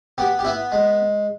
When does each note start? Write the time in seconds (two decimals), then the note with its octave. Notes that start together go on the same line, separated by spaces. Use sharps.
0.18 B3 G4
0.39 G4
0.45 B3 E4
0.72 G#3